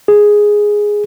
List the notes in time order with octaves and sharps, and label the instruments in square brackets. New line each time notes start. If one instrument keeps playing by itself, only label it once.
[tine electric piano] G#4